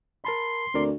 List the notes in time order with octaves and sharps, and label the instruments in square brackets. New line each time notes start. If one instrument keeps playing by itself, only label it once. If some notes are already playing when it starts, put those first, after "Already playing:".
[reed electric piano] A#4 A5 B5 [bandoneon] C6
[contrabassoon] D2 [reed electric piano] C4 A#4 D5